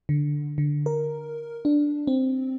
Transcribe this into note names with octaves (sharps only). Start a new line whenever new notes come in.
D3
D3
A#4
D4
C4